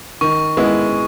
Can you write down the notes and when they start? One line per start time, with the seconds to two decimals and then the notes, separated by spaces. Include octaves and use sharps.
0.21 D#3 C#6
0.57 G#3 B3 E4